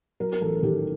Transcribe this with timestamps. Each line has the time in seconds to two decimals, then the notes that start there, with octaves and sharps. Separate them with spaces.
0.20 F#3 A#4
0.33 A#4
0.41 A1 A4
0.62 D#3 G4